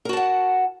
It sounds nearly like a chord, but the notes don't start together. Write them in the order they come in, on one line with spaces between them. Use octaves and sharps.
A#4 F#4 A5 F#5